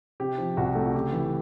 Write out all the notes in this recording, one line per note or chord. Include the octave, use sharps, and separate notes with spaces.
C3 G4
F3
C2 F#4
A3
F#4
C#3 G4
E3